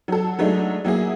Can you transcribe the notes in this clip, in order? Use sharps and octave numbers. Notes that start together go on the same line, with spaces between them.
F#3 A4
F#3 G#3 A3 D4 D#4
F#3 A#3 E4 G#4